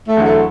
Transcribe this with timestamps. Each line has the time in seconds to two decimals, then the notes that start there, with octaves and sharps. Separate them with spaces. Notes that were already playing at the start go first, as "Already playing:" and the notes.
0.09 A3
0.17 E2 D3 F#3
0.26 A3